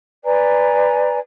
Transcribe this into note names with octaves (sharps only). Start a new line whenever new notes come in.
B4 D5 G#5 A#5